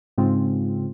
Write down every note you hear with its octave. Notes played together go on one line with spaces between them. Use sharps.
G#2 C#3 G#3 C4 F4